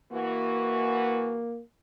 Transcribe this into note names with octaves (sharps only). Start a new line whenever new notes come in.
E3 A#3 F#4